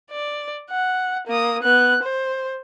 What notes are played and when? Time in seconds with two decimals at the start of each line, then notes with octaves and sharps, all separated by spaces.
0.11 D5
0.70 F#5
1.27 A#3 D#6
1.63 B3 F#6
2.03 C5